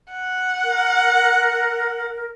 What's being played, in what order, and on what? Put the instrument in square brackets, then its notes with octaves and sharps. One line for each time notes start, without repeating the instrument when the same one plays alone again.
[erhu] F#5
[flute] A#4